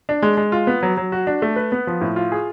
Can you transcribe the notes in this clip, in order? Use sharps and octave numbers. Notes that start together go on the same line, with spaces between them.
D4
G#3
G#3
F4
B3
F#3
F#3
F#4
D4
A3
B4
B3
F3
A2
F4
G#4